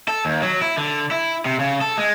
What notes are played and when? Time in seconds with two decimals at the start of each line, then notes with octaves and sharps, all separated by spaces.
0.08 A4
0.25 D#2
0.42 F#3
0.62 E4
0.77 D3
1.11 E4
1.46 C3
1.59 C#3
1.81 A4
1.98 G#3